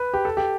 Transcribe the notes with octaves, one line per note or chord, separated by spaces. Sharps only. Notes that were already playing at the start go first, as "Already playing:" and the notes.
Already playing: B4
G4
A4
G4